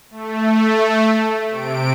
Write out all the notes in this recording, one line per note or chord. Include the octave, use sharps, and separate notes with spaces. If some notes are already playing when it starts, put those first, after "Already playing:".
A3
C3 D7